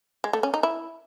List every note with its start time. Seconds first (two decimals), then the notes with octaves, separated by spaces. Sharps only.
0.24 G#3
0.33 A3
0.43 C#4
0.54 D#4
0.63 E4